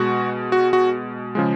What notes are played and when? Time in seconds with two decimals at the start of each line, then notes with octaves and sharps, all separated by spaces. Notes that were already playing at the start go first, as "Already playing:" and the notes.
Already playing: B2 G#3 F#4
0.52 F#4
0.73 F#4
1.35 C#3 F3 G#3